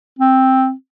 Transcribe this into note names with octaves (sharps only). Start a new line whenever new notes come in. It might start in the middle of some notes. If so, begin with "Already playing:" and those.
C4